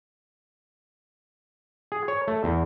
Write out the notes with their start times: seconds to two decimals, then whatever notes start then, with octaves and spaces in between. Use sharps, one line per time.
1.92 G#4
2.08 C#5
2.28 A3
2.44 E2